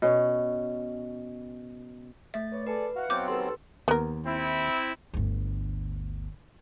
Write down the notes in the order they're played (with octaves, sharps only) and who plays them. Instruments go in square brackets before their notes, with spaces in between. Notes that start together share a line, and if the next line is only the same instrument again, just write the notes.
[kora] B2 C#4
[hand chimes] A3 A6 [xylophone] E5
[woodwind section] B4 C#5 D5
[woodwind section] G#4 A4 D5 [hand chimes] B4
[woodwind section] E4 F5 F#5 [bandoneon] F#4
[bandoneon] F#3 B3 C4 [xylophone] D6 G6
[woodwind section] D#2 A4 [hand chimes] B4 C6
[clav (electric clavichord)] D#2 [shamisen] B3 A#4
[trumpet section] C4 E4
[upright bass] G1 D2